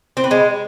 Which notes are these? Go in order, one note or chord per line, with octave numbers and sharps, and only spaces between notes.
C4
B4
G#3